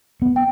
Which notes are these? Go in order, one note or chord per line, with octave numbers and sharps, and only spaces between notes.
B3
G5